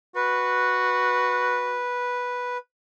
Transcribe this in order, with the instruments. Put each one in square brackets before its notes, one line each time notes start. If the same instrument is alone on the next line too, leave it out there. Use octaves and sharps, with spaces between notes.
[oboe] F#4 [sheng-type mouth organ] B4